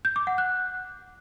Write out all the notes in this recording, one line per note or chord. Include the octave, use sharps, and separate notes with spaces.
G6
D6
F#5
F#6